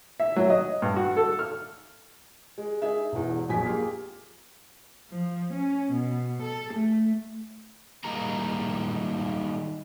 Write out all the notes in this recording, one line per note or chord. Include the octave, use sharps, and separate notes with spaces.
E5
F#3
D#5
G2
F#4
A4
F6
G#3
D#4 G#4 E5
E1 E2
A#1 F2 F#3 G#3 G#5 B6
A#3 F4 G4 G#4
F3
C#4
B2
A4
A3
D#3 G3 G#3 A#3 D#4 A#5